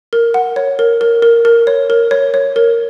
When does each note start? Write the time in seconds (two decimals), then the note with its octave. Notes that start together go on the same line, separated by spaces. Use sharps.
0.13 A#4
0.34 F#5
0.56 C#5
0.79 A#4
1.01 A#4
1.22 A#4
1.45 A#4
1.67 C#5
1.90 A#4
2.11 C#5
2.34 C#5
2.56 A#4